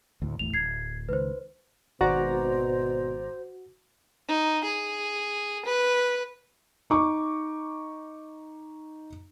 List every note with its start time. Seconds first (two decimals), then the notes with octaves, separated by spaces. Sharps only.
0.22 D2 A2
0.39 G#1 E2 A2 F7
0.54 D1 G#6 C7
1.09 C#2 D#3 B4 C5
2.01 G#1 B2 F#4 C5 D5 A#5
4.29 D#4
4.64 G#4
5.66 B4
6.90 D#4 C#6 D6